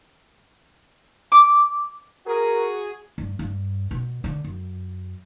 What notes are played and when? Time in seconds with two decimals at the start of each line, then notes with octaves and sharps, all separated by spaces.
1.32 D6
2.27 F#4 G#4 A#4
3.18 G2
3.39 G2
3.91 B2
4.24 D3
4.44 F#2